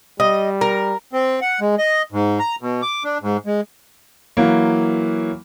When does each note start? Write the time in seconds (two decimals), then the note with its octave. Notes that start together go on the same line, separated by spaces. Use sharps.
0.20 G3 D#5
0.61 A#4
1.13 C4
1.41 F#5
1.61 G#3
1.78 D#5
2.12 G#2
2.39 A#5
2.61 B2
2.82 D6
3.04 D4
3.22 G#2
3.46 G#3
4.37 E3 F#3 A#3